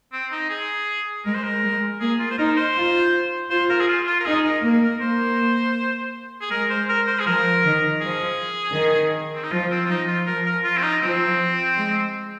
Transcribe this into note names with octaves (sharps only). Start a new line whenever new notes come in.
C4
D#4
G#4
G#3 A#4
C5
A#4
G#3
A#3 G#4
F4
C5
D#4 A#4
C5
F4
F4 C5
A#4
G#4
F4
F4
A#4
D#4 G#4
A#4
A#3
A#4
A#3 C5
G#4
G#3 A#4
C5
A#4
C5
G#4
F3 A#4
D#3
F3 G#4
D#3
C4
D#4
F3 F4
C4
F4
F3 D#4
F4
F3 A#4
A#4
F4
C4
D#4
F3 C4
G#3